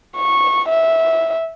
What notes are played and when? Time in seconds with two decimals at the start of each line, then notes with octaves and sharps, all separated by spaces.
0.17 C#6
0.69 E5